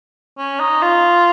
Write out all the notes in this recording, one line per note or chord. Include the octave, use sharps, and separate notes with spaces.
C#4
D#4
F4